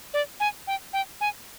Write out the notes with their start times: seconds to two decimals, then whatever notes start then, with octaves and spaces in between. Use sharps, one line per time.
0.14 D5
0.40 G#5
0.67 G5
0.93 G5
1.21 G#5